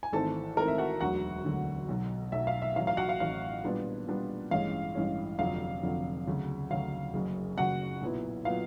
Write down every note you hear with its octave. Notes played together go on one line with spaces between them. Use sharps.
G#5
G#1 G#2 E3 A3 C4 A4 A5
G#1 G#2 E3 A3 C4 A#4 A#5
E5
F#4 F#5
E1 D2 D3 F#3 F#4 F#5
E1 D2 D3 F#3
B1 B2 F#3
B1 B2 F#3 E5
F5
E5
A1 A2 F#3 F5
F5
F#4 F#5
F5
A1 A2 F#3 F5
A#2 G3 B3 D4 F4
A#2 G3 B3 D4 F4
A1 G2 E3 G#3 C#4 F5
A1 G2 E3 G#3 C#4
F1 F2 D3 F#3 F5
F1 F2 D3 F#3
D2 C#3 F#3
D2 C#3 F#3 F5
F#1 F#2 C#3
F#1 F#2 C#3 F#4 F#5
B1 A#2 F#3 B3 E4
A#2 F#3 B3 E4 F5